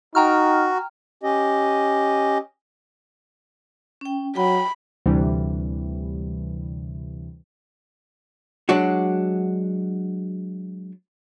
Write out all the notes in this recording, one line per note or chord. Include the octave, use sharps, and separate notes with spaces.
D#4 F#4 G5 A#5 F6
C#4 G4 D#5
C#4 G5
F#3 G5 B5
D2 C3 E3 G3
F#3 G#3 D4 F#4